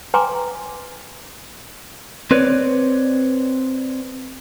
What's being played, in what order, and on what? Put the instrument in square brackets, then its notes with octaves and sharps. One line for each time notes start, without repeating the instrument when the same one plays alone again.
[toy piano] B4 G5 G#5 A#5 C6 D6
[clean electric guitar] C4 B4 C#5 D5